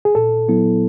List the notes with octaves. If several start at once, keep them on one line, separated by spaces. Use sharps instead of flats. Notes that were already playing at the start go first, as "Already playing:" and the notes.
G#4
A#2 A4
F#3 B3 E4